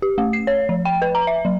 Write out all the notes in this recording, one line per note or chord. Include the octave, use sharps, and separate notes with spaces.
G4
A3
C7
C#5
F3
G5
B4
A#5
E5
F#3